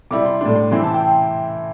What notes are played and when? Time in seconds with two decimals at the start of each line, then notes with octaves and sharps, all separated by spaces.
0.11 C3 G3 E4 D6
0.25 C6
0.41 A2 G3 D4 C6
0.55 C6
0.71 C3 E3 C4 E4 C6
0.84 A5
0.94 G5